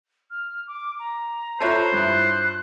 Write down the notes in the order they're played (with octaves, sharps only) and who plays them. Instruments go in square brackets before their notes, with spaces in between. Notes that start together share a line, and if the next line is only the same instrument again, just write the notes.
[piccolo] F6
D6
A#5
[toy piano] F4 E5 A5 [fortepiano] A4 C#5 F#6 [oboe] C5
[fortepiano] G2 E4 [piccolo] F#6